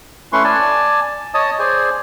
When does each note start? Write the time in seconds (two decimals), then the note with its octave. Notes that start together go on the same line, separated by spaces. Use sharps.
0.33 A3 C#4 E4 B4 C6 C#6
0.44 D5 G#5 A5
1.34 C#5 D#5 A5 D#6
1.59 G#4 C5 D5 G#5